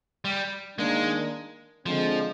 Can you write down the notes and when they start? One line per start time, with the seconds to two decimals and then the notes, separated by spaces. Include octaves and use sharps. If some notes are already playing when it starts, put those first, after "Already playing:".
0.25 G3
0.78 D#3 G#3 A#3 D4
1.85 D3 F3 G#3 C4